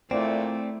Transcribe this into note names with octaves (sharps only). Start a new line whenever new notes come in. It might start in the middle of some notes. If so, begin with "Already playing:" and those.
A#2 A3 C4 E4 C5 D5